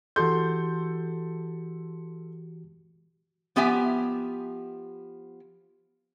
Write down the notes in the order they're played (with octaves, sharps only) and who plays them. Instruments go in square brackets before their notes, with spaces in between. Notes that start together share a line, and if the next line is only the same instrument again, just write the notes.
[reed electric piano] E3 F#4 G4 [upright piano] A4 C6 G6
[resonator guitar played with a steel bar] F3 B3 G4 E5 G#5